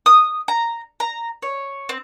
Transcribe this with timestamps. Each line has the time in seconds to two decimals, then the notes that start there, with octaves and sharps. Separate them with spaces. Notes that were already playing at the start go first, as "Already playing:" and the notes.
0.06 D#6
0.48 A#5
1.00 A#5
1.42 C#5
1.89 C4